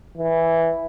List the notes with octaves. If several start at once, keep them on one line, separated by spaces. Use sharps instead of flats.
E3